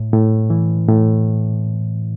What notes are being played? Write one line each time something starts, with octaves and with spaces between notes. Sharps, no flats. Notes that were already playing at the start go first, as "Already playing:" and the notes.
Already playing: A2
A2
E3
A2